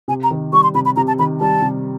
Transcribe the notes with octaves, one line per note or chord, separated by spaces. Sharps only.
C3 G#5
A#5
D#3
G3 C#6
C6
C3 B5
B5
C3 A#5
A5
D#3 B5
G3 A5
C3